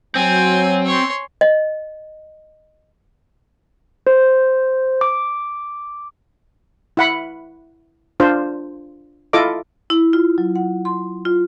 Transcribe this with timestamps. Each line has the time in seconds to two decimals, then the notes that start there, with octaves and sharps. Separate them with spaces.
0.15 F#3 C4 G#5
0.86 C#5 C6
1.41 D#5
4.07 C5
5.01 D6
6.97 E4 F#5 B5
8.20 D4 F4 C5
9.33 E4 F4 A4 D#5 D6
9.90 E4
10.13 F4
10.38 F#3
10.56 F#5
10.85 C6
11.25 F4